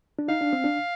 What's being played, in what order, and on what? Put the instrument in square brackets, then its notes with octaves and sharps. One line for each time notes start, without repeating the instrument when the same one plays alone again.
[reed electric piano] D4
[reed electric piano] D#4 [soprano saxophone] F5
[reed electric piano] D4
C4
D4